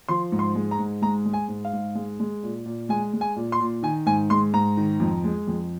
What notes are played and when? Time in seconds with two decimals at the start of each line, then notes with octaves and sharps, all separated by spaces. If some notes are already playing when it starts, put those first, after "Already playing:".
0.09 F3 C6
0.32 G#2
0.39 C6
0.55 G#3
0.71 A#5
0.79 G#2
1.02 G#3 A#5
1.25 G#3
1.33 G#5
1.48 G#2
1.65 F5
1.73 G#2
1.95 G#3
2.20 G#3
2.43 A#2
2.66 A#2
2.89 G#3 G#5
3.13 G#3
3.21 G#5
3.36 A#2
3.52 C6
3.60 A#2
3.83 D#3 G#5
4.06 G#2 G#5
4.30 G#3 C6
4.54 G#2 A#5
4.77 D#3
5.00 F2
5.24 G#3
5.47 F2